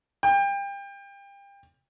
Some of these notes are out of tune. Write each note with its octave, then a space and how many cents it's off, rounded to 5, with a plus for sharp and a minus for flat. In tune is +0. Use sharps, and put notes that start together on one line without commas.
G5 +30